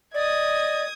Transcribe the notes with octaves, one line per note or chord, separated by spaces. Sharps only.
D5 D#5 D#6 G#6